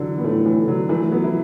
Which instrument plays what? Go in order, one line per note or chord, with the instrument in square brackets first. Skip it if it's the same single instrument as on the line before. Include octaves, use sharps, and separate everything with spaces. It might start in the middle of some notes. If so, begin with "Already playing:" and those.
Already playing: [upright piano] D3 E3 F#3
B3
[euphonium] A2 [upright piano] E3 A3
[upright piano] E3
D3 F#3
E3 A3
F#3 B3
E4